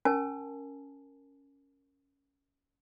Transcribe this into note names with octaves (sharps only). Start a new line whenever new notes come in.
C#4 A#4 G#5 A5